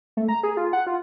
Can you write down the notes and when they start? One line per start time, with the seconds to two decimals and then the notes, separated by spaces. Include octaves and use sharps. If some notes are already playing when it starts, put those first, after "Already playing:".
0.17 A3
0.29 A#5
0.43 G#4
0.57 F4
0.73 F#5
0.87 F4